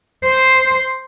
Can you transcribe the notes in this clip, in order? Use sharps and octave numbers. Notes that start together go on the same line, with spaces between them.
C5